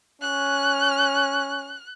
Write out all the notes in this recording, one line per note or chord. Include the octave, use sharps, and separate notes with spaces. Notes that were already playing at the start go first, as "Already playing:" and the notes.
C#4 F#6